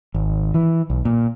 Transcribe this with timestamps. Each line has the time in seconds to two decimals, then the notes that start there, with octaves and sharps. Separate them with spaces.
0.15 G#1
0.54 E3
0.90 B1
1.05 A#2